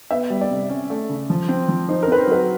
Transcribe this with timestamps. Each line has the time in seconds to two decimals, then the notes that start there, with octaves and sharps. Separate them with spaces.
0.11 B3 E5
0.30 G3
0.41 D5
0.51 C3
0.70 C#4
0.90 A3
1.09 C#3
1.30 F3
1.49 C4
1.68 F3
1.89 D#4 C5
2.03 A#4
2.08 C4 B4
2.18 C5
2.27 F#3 B4